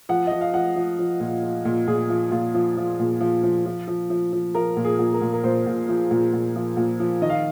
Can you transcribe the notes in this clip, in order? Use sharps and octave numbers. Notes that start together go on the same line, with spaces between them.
F3 F#5
F3 D#5
F5
F3 F#5
F3
F3
A#2
F3
A#2
A#2 G#4
F3
A#2 F4
F3
F3
A#2
F3
F3
F3
F3
F3
F3
F3 A#4
A#2
G#4
A#2
A#4
A#2
A#4
A#2 C5
A#2
F3
A#2
A#2
F3
A#2
F3
D#3 D#5
F5